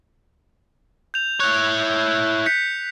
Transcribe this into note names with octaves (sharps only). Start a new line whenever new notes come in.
G6 F7
E4 C#5 F#6
G6 B6 C#7